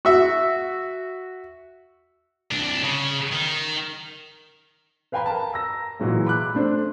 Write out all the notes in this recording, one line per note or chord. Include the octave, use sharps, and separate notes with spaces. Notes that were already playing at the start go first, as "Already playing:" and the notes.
F#4 E5
C2 D4
C#3
D#3
B4 F5 G5 G#5 A#5 B5
A#4 A5
A#5 E6 A#6
A#2 E3 F#3 G#3
B5 D6 F#6
A3 D4 C5